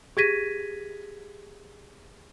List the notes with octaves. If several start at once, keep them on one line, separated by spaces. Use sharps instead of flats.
G4 G#4 G#6 A#6 B6 D#7